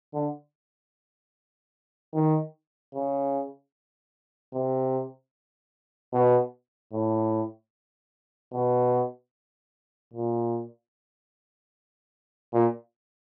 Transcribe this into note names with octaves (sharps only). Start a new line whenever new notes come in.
D3
D#3
C#3
C3
B2
A2
B2
A#2
A#2